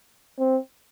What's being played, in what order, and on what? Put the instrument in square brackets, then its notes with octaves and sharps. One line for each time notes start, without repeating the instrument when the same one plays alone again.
[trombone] C4